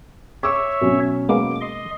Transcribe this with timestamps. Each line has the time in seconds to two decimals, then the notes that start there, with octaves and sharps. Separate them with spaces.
0.43 C#5 E5 C#6 D6 E6
0.81 B2 F#3 C#4
1.29 G#3 A#3 B3 D6
1.61 D#5 C6